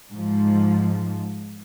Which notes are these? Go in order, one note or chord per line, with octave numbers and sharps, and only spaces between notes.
G#2 F3